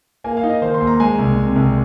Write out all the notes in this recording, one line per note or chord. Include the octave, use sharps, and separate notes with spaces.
A#3 G#5
F5
D#4
D#5
D#3 C5
C6
D#2
A#5
G#3 G#5
C2
C3
C2